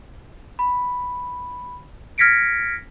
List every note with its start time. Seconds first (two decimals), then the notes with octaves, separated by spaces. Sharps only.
0.59 B5
2.18 F6 G#6 A#6 B6 C#7 D7